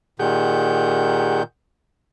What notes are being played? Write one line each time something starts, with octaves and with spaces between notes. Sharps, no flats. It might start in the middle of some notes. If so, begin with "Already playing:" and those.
A#2 D#3 G4 G#4 F#5 G6